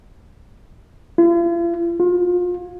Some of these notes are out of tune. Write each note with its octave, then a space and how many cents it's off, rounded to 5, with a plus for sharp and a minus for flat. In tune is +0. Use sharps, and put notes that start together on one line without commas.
F4 -45
F4 +30